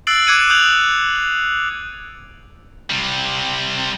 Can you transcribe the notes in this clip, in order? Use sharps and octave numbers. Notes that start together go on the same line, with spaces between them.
E6 F#6 A6 C7 D7 F#7
D6 F#6 G#6 C#7 D#7
D#6 F#6 G6 F7 F#7
F#7
C3 G3